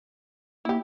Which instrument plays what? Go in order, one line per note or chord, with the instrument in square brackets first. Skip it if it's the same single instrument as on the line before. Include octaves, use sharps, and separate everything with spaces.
[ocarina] A#3 [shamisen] E4 G4